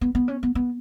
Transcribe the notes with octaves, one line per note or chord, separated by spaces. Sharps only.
B3
B3
C#4
B3
B3